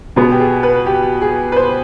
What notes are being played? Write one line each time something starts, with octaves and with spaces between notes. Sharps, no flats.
B2 B3 G#4
G4
G#4
B4
G4
G#4
B4
C5